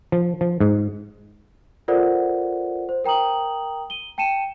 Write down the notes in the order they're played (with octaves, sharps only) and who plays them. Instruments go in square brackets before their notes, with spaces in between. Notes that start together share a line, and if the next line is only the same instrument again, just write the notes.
[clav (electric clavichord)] F3
F3
G#2
[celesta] F4 A4 A#4 C5 D5 F#5
C5
A#4 G5 A#5 D#6 F#7
D#7 G7
G5 A5 C#7 D#7 E7